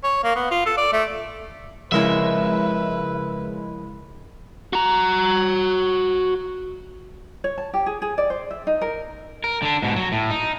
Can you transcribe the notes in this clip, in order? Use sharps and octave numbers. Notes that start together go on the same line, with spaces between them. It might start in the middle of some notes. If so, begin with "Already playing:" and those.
C#5
A#3
B3
F4
A4
D5
A3
C#3 F3 G#3 E4 A#4 B4 C#5 E5
F#4 A#5
C#5
A5
G4
G#4
G#4
D5
C5
E5
D#4
A#4
A#4
D3 D4
G#2 B2
F#3
A2
D#4